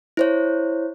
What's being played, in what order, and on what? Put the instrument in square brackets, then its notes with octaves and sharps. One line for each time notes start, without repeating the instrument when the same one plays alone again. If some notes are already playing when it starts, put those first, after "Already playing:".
[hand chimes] E4 C5 C#5